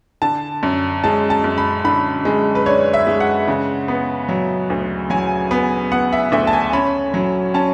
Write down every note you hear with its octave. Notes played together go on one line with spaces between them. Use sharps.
D3 A5
F#2
G#3 A5
A5
F#2
B5
D3 B5
G#3
B4
D4 C#5
E5
G#3
F#5
C#3
B3
F#3
D2
F#3 G#5
B3
B3 F#5
E5
D2 E5
A5
G#5
C#4 B5
F#3
C#4 A5